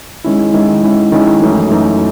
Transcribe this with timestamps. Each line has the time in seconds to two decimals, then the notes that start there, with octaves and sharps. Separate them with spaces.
0.24 D#3 G#3 C#4 E4
0.53 D#3 G#3 C#4 E4
0.83 D#3 G#3 C#4 E4
1.12 D#3 G#3 C#4 E4
1.41 F#2 E3 A3 D#4
1.70 F#2 E3 A3 D#4